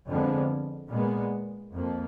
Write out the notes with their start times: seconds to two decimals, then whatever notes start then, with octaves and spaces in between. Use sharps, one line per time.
0.09 F2 D3 F3 G#3 B3
0.90 A#2 G#3 B3
1.73 F2 F3 A#3